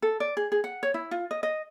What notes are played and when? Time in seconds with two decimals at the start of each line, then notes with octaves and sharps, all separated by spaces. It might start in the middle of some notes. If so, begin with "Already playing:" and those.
0.02 A4
0.20 D5
0.37 G#4
0.52 G#4
0.64 F#5
0.83 C#5
0.94 E4
1.11 F4
1.31 D#5
1.43 D#5